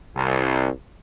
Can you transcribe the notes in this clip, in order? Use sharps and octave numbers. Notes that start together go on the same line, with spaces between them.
C2